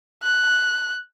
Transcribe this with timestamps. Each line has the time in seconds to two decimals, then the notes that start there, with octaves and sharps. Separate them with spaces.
0.23 F#6